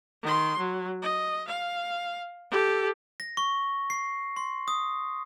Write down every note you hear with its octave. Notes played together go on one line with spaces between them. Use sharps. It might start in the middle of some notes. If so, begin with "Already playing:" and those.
D#3 C6
F#3
D#5
F5
G4 A4
A#6
C#6
C7
C6
D#6